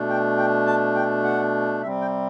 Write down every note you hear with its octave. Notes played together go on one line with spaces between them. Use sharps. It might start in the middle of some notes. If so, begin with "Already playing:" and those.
Already playing: B2 A3 D4
G5
G5
A5
G5
F#5
C3 G3 C4 E5
G5